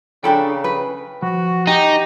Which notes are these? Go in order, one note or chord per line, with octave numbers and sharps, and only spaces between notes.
C#3 D4 G4 A4 G5 A#5 B5
B4
F3 F#4
D#4 G4 D#5 G#5